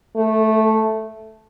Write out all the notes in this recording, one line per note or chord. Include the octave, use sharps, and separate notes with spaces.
A3